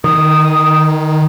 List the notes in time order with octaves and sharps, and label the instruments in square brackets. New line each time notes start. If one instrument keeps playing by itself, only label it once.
[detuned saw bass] D#3 [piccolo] D#6